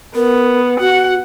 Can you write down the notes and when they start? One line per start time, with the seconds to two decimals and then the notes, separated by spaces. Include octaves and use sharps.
0.15 B3 A#4
0.80 F#4 F#5